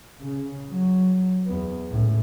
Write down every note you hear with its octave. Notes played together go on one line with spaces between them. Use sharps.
C#3
F#3
E2 B3
C#2 A2